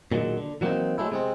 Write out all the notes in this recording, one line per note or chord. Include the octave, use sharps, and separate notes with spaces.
A#2 D3 D#3 F3 F#3 G#3
D3
E3 F#3 G3 A#3 C4 D#4
F#3 G#3 A3 E4
C3 G#3 C4